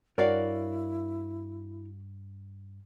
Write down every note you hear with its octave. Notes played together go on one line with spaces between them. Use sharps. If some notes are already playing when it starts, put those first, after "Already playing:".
G2 E4 F#4 A#4 C#5 D5 F5 F#5